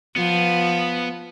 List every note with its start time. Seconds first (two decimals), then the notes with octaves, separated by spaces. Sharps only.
0.16 F3 B3